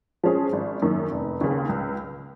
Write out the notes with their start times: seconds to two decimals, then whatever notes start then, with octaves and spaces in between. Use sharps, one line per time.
0.24 F3 G#3 C#4 G#4
0.53 G#1
0.82 F#2 D#3 A#3
1.12 F1
1.41 D#2 C#3
1.69 C#2